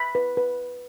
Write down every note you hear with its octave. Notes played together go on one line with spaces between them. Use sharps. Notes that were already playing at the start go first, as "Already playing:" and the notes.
Already playing: B5
B4
B4